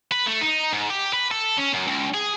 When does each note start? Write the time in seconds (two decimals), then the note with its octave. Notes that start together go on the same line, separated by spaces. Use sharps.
0.12 B4
0.26 A3
0.41 D#4
0.73 G#2
0.90 G4
1.13 B4
1.31 A4
1.58 C#4
1.73 F#2
1.87 C#2
2.14 G#4